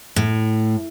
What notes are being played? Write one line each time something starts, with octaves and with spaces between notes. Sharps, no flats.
A2